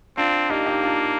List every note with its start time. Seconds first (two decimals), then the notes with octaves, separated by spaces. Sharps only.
0.17 C4 D4 F4
0.50 A#3 D#4 G4
0.66 D#4 G4
0.83 D4 F4